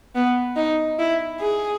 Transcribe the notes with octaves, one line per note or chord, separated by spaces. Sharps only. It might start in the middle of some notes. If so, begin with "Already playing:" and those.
B3
D#4
E4
G#4